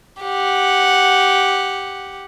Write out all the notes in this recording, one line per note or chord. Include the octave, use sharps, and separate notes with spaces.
G4 F#5